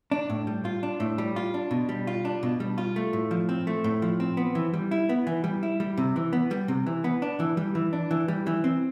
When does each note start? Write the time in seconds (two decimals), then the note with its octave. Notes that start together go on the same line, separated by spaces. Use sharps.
0.11 D4
0.30 A2
0.47 G3
0.65 F4
0.83 D4
1.00 A2
1.18 G3
1.36 F4
1.54 D4
1.71 B2
1.89 G3
2.07 F4
2.25 D4
2.43 B2
2.60 G3
2.78 F4
2.96 A3
3.13 A2
3.31 F3
3.49 C4
3.67 A3
3.84 A2
4.02 F3
4.20 C4
4.37 B3
4.55 E3
4.74 G3
4.91 E4
5.09 B3
5.27 E3
5.44 G3
5.63 E4
5.80 G3
5.97 C3
6.16 E3
6.33 B3
6.51 G3
6.68 C3
6.86 E3
7.04 B3
7.22 D4
7.40 E3
7.57 G3
7.75 E3
7.93 D4
8.11 E3
8.28 G3
8.47 E3
8.64 C4